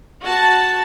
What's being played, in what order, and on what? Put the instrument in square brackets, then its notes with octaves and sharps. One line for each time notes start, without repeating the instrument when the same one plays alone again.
[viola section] F#4 A5